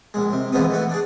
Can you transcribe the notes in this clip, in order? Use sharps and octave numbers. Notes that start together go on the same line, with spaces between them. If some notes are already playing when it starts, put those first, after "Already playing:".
A#1 G#3
C3
A#1 E3 F3 G#3 B3 D#6
E3 A3 F#4
D4 G#4